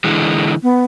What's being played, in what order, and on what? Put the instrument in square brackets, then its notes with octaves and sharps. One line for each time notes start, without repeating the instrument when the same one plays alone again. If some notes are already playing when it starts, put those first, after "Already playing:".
[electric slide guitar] D3 E3 G#3
[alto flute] B3